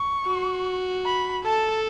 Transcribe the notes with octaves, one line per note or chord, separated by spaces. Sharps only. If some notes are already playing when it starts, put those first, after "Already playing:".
Already playing: C#6
F#4
B5
A4 A5